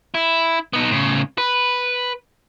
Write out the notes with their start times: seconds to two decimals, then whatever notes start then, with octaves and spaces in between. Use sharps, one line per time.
0.14 E4
0.73 B3 D#4
0.91 A2 C#3
1.38 B4